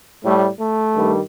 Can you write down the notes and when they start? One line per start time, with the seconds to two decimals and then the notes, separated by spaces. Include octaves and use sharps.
0.24 A2 G3 A3
0.60 A3
0.95 G2 D#3 G3